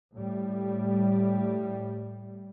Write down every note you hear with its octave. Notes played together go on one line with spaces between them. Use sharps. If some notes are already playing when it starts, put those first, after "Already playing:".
A2 G3